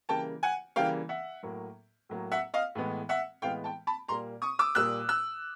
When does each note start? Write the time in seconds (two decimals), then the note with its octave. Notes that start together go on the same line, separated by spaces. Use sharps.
0.09 C#3 E3 G3 A#3 G5 A5
0.43 F#5 G#5
0.76 C#3 E3 G3 A#3 F5 G5
1.09 E5 F#5
1.43 A2 F#3 A#3
2.09 A2 F#3 A#3
2.32 E5 F#5
2.54 D#5 F5
2.75 A2 E3 G#3 B3
3.09 E5 F#5
3.42 A2 E3 G#3 B3 F5 G5
3.64 G5 A5
3.87 A5 B5
4.08 A#2 G3 A#3 A#5 C6
4.42 C#6 D#6
4.59 D6 E6
4.75 A#2 G3 A#3 E6 F#6
5.09 E6 F#6